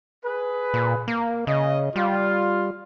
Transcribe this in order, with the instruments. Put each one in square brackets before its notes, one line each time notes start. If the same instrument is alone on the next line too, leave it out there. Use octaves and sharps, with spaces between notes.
[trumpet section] G#4 B4
[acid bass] A#2
A#3
[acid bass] C#3 [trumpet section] D#5
[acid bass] G3 [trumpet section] F4